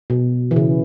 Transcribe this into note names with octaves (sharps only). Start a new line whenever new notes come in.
B2
E3
C#3